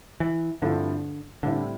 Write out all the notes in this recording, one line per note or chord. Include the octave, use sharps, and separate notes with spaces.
E3
G2 D3 F3 A3 C4 E4
A2 D3 G3 C4 E4